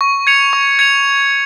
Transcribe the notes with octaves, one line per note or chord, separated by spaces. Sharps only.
C#6
G#6 C#7 F7
C#6
G#6 C#7 F7